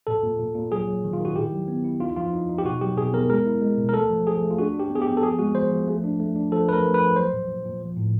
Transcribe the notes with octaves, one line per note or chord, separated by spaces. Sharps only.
A#2 A4
A#2
A#2
A#2
F#3 G#4
F#3
D#3
F4
D#3
F#4
E4 G4
F#3
B3
E4
D#4 F4
F3 F4
D#4
D#4
G4
B2 F#4
F#3 G4
B2 G#4
B3 A#4
G#3 A#4
E4
G#3
B2
A#4
A3 A4
F3
F3 G#4
A3
F4
D4 F#4
D4
G4
B3
G#4
G4
B3
A4
F3 G#4
G#3 F#4
F3 C5
F3
A3
D4
A3
D4
F3 A4
A3 B4
A#4
A3
B4
F3
F#3 C5
A#2
A#2
A#2
F3
A2